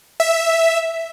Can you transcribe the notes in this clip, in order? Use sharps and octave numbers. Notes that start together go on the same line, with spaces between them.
E5